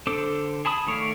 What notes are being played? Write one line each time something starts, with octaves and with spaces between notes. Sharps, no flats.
D3 D4 A4 C5 D6
G#4 A5 B5 D#6
D#3 A3 C#5 D5 F5